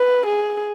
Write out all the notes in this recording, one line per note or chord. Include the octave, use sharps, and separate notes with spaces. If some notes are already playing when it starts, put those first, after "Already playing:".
Already playing: B4
G#4